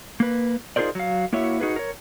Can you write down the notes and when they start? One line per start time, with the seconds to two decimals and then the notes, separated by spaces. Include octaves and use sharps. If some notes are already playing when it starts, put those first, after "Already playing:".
0.20 A#3 B4
0.76 D#4 F4 G#4 A#4 C5 D5
0.95 F#3 F5
1.33 A#3 E4 F#4 C#5 E5
1.60 D#4 F#4 G#4 B4
1.76 A#4 C#5